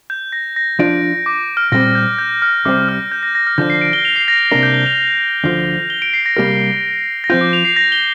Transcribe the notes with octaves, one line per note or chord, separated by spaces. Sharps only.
G6
A#6
A#6
F3 D4 F4 D5 D7
D6
F6
A#2 G3 C4 A#6
G6
G6
F6
C2 C3 G3 C4 D6
F6
G6
A#6
A#6
F6
D3 F3 D4 G6
C7
D7
G7
F7
C7
A#6
C2 C3 A#3 D4 A#4 A#6
G6
G7
F7
D2 D3 F3
G7
D7
C7
A#6
C3 G3 A#3 G4 A#4
A#6
F3 C4 F4 G6
D6
F7
C7
A#6
G7